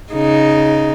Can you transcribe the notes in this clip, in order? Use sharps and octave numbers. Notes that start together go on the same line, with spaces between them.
C#3 D#4